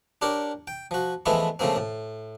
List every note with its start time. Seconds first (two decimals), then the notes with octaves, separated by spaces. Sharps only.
0.22 D4 G4 A#4 C#5
0.67 G5
0.91 F3 F#4
1.26 E3 F3 G#3 A3 B3 E4
1.59 C#3 F3 A3 A#3 C4
1.76 A2